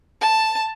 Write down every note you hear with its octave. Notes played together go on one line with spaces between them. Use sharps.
A5